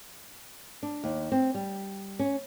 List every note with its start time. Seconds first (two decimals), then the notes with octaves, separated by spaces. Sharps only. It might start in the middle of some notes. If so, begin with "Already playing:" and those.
0.83 D4
1.04 D#2
1.32 C4
1.55 G3
2.19 C#4